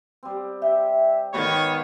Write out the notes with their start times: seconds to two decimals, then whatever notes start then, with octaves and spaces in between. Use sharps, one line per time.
0.23 G3 C4
0.62 G4 E5
1.33 G#2 B2 D#3 C#5 D5 B5